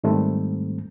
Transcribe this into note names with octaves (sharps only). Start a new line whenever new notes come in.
G#2 D#3 G3 A3 C4